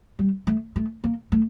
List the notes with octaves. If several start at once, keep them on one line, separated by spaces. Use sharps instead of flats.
G3
A3
A3
A#3
A3